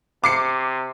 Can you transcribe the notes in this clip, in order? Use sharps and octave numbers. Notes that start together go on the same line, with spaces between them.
C3 D6 C7 C#7